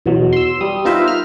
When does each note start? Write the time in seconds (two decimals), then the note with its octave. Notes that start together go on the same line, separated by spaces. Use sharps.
0.06 E2 B2 F#3
0.33 C6 E6
0.61 G3 D#6
0.85 B3 D#4 F4 A#4 C5 E5
1.08 F6